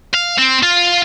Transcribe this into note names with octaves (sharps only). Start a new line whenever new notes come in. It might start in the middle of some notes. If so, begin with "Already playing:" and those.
F5
C4
F4